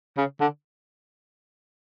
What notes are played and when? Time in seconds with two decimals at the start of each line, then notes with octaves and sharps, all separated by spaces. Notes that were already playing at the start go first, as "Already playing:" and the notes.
0.17 C#3
0.40 D3